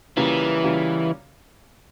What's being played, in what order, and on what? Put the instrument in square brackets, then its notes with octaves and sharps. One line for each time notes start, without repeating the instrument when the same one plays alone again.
[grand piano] C#3 G3 A#3 C#4 F4 [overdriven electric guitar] E3
[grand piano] C#3 G3 A#3 C#4 F4